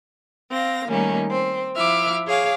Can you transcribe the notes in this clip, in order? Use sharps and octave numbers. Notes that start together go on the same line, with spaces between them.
C4 F5 A#6
D#3 G3 A3 A#3 C#4 D#4
C4
F3 E4 E5 D6 F6
G#4 C#5 F5 D6